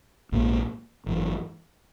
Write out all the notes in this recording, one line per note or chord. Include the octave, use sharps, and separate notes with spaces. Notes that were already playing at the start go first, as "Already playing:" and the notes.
A#1 G#2 E3 A#3
G#1 F#2 C#3 E3